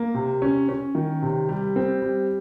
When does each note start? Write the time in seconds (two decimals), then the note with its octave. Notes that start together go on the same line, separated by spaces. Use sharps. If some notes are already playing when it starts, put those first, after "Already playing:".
Already playing: A#3
0.14 C3
0.42 C#4
0.69 C#4
0.95 D#3
1.22 C3
1.49 G3
1.76 C4
2.02 G3